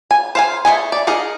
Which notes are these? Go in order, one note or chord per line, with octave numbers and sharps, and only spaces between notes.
G#5
C5 F5 G#5
A3 F4 D#5 G#5
D5
D#4 G#4 A#4 D#5